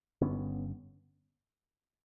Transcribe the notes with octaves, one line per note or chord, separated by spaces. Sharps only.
G1 G2 D3 B3 C#4